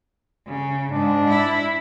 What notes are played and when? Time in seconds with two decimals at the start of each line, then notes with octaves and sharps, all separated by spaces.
0.46 C#3
0.91 G#2 D4
1.29 E4